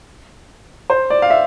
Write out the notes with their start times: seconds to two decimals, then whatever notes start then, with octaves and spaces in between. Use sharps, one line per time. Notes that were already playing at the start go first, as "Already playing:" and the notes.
0.90 C5
1.10 D5
1.22 F5
1.30 E5